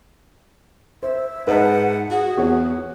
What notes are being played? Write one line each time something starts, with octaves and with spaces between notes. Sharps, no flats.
C5 E5
G#2 B4 D#5 F#5 A5
F#4 G#4
E2 F#4 C#5 F#5